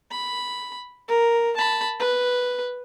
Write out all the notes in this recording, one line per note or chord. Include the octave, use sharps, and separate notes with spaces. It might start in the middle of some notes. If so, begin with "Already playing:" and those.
B5
A#4
A5 B5
B4